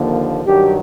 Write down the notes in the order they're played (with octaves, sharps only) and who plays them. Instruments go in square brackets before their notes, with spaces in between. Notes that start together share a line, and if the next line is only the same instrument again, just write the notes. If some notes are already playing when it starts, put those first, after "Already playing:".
Already playing: [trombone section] D#2 D3 F3 A#3
G2 D#3 F#3 G4